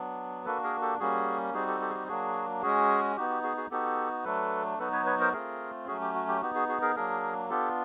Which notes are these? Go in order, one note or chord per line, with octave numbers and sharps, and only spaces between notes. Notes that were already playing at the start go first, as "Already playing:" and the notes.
Already playing: F#3 B3 D4
A#3 D4 F#4 A4 B4
G#4 A#4
G4 A4
G3 A#3 C#4 F#4 G#4
G3 C4 D#4 F#4 G#4
G4 A4
G4 A4
G#4
G4
F#3 A#3 D4 F#4 G#4
G#3 C#4 F#4 G#4
B3 D#4 F#4 G4
G4
F#4 G#4
F#4 G#4
B3 D#4 F#4 G4 A4
F#3 A3 D4 A4 B4
F#3 B3 D#4 F#4 A4 B4
B4 C#5
B4 C#5
A#4 C5
A3 C4 F4 G#4 A#4
F#3 A3 C#4 F#4 G#4
G4
F#4
G4
B3 D#4 F#4 G4
F#4 G#4
F#4 G#4
G#4 A#4
F#3 A#3 D4 G#4 A#4
B3 D4 F4 G4 A4